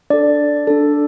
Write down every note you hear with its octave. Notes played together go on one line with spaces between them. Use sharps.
D4 A4 D5
D4 A4